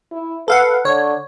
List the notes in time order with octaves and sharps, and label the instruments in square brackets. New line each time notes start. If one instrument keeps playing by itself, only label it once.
[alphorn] E4
[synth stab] A4 F5 F#5 [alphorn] B4
[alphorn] D3 [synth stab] C#5